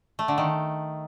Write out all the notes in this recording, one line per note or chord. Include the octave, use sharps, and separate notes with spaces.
A3
D3
D#3